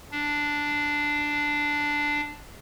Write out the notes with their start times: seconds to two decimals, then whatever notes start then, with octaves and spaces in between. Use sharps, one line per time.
0.11 D4